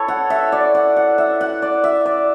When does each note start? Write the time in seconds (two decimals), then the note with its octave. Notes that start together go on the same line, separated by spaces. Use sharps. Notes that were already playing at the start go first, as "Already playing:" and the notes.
Already playing: E4 A4 C#5
0.08 F#5
0.30 E5
0.52 D5
0.75 F#5
0.97 F#5
1.18 E5
1.41 F#5
1.62 D5
1.84 E5
2.06 D5